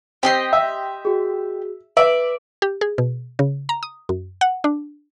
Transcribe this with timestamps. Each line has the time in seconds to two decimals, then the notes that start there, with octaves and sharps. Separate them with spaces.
0.23 C4 G4 D#5 C6
0.53 E5
1.05 F#4 G#4
1.97 B4 D5 E5
2.62 G4
2.81 G#4
2.98 B2
3.39 C#3
3.69 A#5
3.83 D#6
4.09 F#2
4.41 F#5
4.64 D4